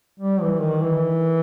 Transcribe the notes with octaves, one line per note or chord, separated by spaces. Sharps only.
G3
E3
D#3
E3